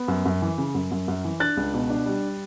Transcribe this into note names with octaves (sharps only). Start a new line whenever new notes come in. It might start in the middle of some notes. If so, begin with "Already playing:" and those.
Already playing: B3
F#2
F#2
E3
C#3
F#2
F#2
F#2
E3
D4 F#6 A6
C#2
B2
D4
G3